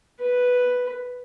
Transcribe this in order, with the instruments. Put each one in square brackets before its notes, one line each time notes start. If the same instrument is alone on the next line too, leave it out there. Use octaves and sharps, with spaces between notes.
[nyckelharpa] B4